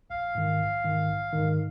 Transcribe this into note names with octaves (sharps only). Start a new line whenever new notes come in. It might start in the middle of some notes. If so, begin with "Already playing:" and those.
A#1 F5
G#2 D#3
A#1
G#2 D#3
A#1
G#2 D#3